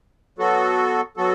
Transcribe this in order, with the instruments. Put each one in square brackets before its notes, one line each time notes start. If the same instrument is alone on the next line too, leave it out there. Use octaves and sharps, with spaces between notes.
[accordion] F#3 B3 F#4 A4
F#3 B3 F#4 A4